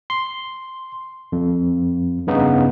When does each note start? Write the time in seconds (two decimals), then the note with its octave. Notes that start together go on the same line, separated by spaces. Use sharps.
0.10 C6
1.32 F2
2.27 G2 C#3 B3 D#4